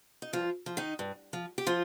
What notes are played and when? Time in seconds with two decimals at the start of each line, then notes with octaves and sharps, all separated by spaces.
0.22 D#4
0.33 G2 F3 F4
0.66 F3
0.77 D#3 D#4
0.99 G2
1.33 F3
1.58 G4
1.67 F3 F4